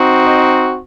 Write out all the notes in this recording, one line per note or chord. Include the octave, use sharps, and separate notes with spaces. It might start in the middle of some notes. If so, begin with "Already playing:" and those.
Already playing: C4 D#4 F#4
C5 D#5